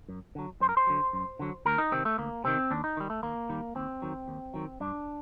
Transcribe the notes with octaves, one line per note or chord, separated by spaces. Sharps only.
F#2
D3 F#3
F#2 C5
A#4
C5
D3 F#3
F#2
D3 F#3
D2 A#4
D#4
C3 D#3 C4
A3
D2 A#3
C3 D#3 C4
D#2 D4
D#4
D#3 G3
A3
D#2 A#3
D#3 G3
D#2 C4
D#3 F#3
D#2
D#3 F#3
G2 D4